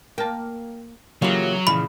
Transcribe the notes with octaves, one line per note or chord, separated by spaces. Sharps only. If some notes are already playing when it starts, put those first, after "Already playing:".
A#3 G5 A5
C#3 E3 F#3 A#3 F4 G4
A#2 C#3 E3 F3 B5